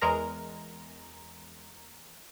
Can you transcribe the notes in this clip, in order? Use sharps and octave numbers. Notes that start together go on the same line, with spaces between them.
E2 G#3 A#4 A#5